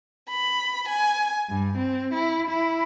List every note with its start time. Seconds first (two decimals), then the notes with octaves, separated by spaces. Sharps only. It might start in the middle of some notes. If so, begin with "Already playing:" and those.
0.29 B5
0.88 G#5
1.49 G2
1.78 C4
2.14 E4
2.49 E4